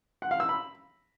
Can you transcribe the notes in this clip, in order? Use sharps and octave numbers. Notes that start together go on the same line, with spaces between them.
F#5
F5
E6
B5